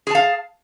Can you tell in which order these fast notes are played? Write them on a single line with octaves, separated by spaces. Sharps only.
G#4 A5 F5